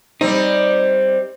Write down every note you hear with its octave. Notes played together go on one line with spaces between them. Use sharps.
G3 C4 D#4